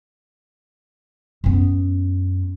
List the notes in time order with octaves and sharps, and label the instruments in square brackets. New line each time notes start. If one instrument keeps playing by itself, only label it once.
[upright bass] F#2 B3